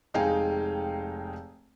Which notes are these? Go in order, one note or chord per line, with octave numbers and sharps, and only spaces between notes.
F1 G#3 D#4 F5 G5 G#5